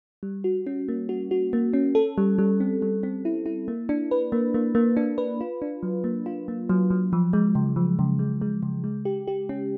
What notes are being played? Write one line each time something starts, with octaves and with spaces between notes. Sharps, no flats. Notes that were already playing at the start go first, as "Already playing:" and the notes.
G3
F#4
C#4
A#3
F#4
F#4
A#3
C#4
A4
G3
G3
C4
G3
C4
E4
E4
A#3
D4
B4
A#3
A#3
A#3
D4
B4
F4
D4
F#3
A#3
F4
A#3
F#3
F#3
F3
G#3
C#3
F3
C#3
G#3
G#3
C#3
G#3
G4
G4
C#4